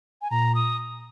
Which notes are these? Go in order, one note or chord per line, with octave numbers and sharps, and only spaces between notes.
G#5
A#2 A#5
D#6